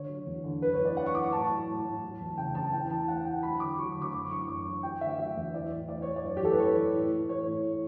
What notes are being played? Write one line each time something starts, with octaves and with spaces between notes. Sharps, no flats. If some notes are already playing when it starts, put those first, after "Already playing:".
Already playing: D3 C#5
F#3
E2
D3
F#2 B4
C#5
E3
D5
E3 F#5
C#6
E3 D6
C#6
A2 A5
F#3
A2
A2
F#3
E2
C#3 G5
E2 A5
E3 G5
E3 A5
E3 F#5
E3 G5
F#3 B5
D3 D6
F#3 C#6
D3
D6
F#2 D6
E3 C#6
F#2 D6
E3 C#6
F#3 G5
D3 E5
F#3 E5
E2
E3 D5
A2
A2 D5
E3 C#5
D5
F#2
G4
E3 A4
B4
E3 C#5
E3
A2
E3
E3 C#5
A2